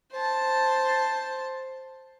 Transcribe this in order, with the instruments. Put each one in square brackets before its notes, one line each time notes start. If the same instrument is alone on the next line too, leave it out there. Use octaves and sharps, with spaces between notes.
[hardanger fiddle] C5 A5